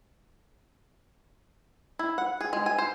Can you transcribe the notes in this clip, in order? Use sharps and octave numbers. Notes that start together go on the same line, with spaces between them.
E4
F#5
G#4
G#3
G#5
C5